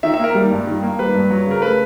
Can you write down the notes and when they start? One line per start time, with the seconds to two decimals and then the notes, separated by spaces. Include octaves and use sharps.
0.03 D#3 E5
0.14 E5
0.19 A#3 A#4
0.35 G3
0.51 G2
0.67 D#3
0.83 A#3
0.99 G3 B4
1.15 G2
1.30 F#3
1.46 C#3 A#4
1.62 A3 B4